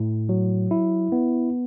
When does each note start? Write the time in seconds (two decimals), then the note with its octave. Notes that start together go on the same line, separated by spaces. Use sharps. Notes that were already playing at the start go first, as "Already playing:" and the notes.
Already playing: A2
0.29 F#3
0.71 E4
1.12 B3